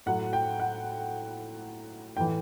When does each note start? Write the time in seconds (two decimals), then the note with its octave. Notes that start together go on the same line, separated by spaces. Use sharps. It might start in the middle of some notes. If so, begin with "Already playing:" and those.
0.06 A2 F#3 F#5
0.33 G5
0.60 F#5
2.17 A2 E3 G5